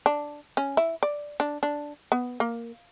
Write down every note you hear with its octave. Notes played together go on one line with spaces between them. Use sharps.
D4
C#4
E4
D5
D4
D4
B3
A#3